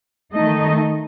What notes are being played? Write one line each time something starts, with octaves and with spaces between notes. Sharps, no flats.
D#3 A3 D#4 D#5